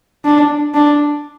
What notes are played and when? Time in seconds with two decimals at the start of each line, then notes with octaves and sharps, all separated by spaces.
0.25 D4
0.74 D4